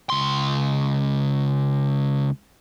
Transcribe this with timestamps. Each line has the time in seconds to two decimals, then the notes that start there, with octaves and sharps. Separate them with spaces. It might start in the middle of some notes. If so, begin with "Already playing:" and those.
0.10 C#2 C6